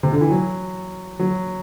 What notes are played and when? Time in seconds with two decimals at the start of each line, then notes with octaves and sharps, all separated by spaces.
0.03 C3
0.12 D3
0.21 E3
0.30 F#3
1.19 F#3